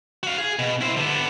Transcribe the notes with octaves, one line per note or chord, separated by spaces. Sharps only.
F#4 F5
G#4
B2
E4 C5
D3 B3